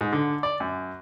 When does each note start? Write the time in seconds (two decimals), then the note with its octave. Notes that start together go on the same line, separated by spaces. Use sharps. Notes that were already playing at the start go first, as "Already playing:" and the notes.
0.01 G#2
0.13 D3
0.43 D5
0.60 F#2